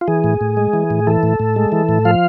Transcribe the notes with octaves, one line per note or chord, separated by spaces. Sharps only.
F4
E3 G#4
A2
A2
G#3
E3
A2
E3 A4
A2
A2
G#3
E3
A2
F3 F5